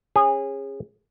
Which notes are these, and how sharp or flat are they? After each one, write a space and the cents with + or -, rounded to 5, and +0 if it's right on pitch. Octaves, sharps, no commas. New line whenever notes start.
C#4 -20 G#4 -25